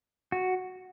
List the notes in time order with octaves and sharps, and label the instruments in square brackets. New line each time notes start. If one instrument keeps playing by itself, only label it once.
[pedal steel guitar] F#4